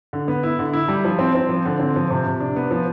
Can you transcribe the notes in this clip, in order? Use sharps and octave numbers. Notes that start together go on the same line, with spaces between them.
D3
B3
E4
D3
E4
G3
F3
C4
C4
F3
D3
C4
F3
C3
C3
D4
B3
F3